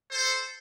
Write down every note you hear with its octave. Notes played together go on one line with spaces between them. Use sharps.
A4 C5